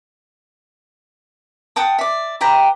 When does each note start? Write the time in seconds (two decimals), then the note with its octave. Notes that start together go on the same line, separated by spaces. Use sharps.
1.76 F#5 G5 A5 D#6
1.99 D5 E5
2.41 G4 B4 G5 A#5